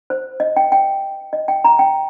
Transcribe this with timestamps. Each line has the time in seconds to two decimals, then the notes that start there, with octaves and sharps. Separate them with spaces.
0.10 C5
0.40 D#5
0.56 G5
0.72 G5
1.33 D#5
1.48 G5
1.64 A#5
1.79 G5